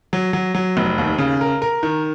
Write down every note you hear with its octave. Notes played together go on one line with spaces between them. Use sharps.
F#3
F#3
F#3
F1
D#2
C#3
A#4
A#4
D#3